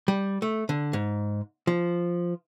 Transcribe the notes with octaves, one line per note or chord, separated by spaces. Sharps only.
G3
A3
D3
G#2
F3